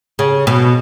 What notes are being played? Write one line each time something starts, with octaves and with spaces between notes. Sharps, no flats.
C#3
B2